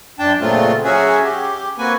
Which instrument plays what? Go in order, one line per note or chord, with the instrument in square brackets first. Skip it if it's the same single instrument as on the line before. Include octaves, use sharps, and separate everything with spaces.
[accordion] F#2 D4 G5 A5
A#2 C#3 F#3 A3 C4 F4
F#3 C#4 F#4 G#4 E5
G4
A#3 C4 F#4 B4 G#5